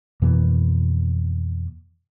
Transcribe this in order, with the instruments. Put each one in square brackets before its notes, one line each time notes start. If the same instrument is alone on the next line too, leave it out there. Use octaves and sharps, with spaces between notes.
[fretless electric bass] F2 B2 E3 A#3